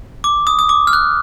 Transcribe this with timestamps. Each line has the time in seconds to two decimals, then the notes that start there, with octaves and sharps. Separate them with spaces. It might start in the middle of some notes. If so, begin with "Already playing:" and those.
0.24 D6
0.47 D#6
0.59 D#6
0.69 D6
0.87 F6
0.93 F#6